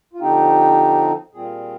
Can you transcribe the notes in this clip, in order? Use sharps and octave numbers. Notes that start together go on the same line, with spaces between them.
F4
D3 F3 C4 D#4 G4
A#2 G3 C4 F4 G#4